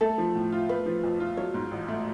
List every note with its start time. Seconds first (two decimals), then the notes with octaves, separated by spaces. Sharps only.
0.01 A3 A4
0.18 F3
0.35 A2
0.52 F4
0.69 A3 B4
0.86 F3
1.03 F2
1.20 F4
1.37 F#3 C#5
1.54 G#2
1.71 A1
1.88 A3